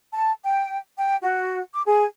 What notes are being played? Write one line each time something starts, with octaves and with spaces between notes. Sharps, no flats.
A5
G5
G5
F#4
D6
G#4